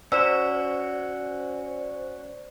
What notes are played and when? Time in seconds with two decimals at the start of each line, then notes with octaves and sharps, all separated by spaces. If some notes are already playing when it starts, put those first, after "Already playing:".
0.12 C#4 F#4 C5 D5 E6 E7